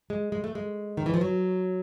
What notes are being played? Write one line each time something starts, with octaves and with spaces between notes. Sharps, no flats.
G#3
G#3
A3
G#3
D#3
E3
F3
F#3